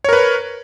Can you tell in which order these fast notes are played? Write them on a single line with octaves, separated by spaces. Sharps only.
C#5 A#4 B4